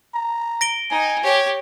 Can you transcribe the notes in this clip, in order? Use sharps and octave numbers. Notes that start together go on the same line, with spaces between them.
A#5
A#6 D7 G7
D#4 G#5
G4 C#5